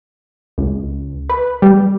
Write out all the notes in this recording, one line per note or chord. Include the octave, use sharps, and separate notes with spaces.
C#2
B4
G3